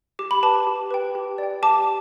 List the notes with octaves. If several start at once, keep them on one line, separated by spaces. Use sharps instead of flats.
G4 D6
B5
B4 G5 A5 D6
G4
B4 G5
G4
D5 G5
G4 A5 D6